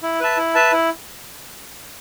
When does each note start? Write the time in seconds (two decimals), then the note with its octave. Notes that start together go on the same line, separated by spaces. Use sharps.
0.03 E4
0.20 B4 E5 A5
0.38 E4
0.55 B4 E5 A5
0.73 E4